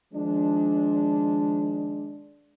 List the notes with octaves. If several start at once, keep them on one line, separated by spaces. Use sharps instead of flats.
D#3 F3 G#3 D4